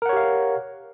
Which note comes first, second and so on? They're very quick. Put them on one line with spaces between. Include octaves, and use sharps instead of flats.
A#4 F#5 C#5 G4 F5